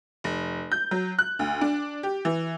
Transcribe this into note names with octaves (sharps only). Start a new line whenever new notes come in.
F1
G6
F#3
F#6
D2
D4
G4
E3